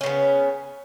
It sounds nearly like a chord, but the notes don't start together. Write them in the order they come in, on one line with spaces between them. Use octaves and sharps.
C#4 C#3 B3